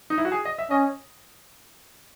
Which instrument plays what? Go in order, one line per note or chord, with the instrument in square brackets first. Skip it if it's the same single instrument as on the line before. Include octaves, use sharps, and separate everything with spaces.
[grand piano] D#4
E4
F#4
G#4
D#5
E5
[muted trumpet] C#4 [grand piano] D#5